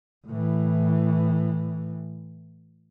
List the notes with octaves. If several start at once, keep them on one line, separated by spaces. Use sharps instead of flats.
A2 E3